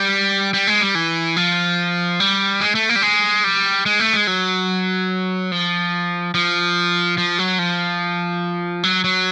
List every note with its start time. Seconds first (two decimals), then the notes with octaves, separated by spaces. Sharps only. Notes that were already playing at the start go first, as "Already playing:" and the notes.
Already playing: G3
0.54 G3
0.67 G#3
0.81 G3
0.95 E3
1.36 F3
2.20 G3
2.61 G#3
2.75 A3
2.89 A#3
2.96 G3
3.02 G#3
3.44 G3
3.86 G#3
4.00 A3
4.13 G#3
4.27 F#3
5.52 F3
6.35 F3
7.18 F3
7.39 F#3
7.59 F3
8.83 F#3
9.04 F#3